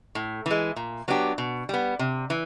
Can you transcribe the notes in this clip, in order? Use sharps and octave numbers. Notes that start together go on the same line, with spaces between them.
A2
E3 G#3
A#2
F#3 B3 D4 G4
B2
G3 B3
C3
E3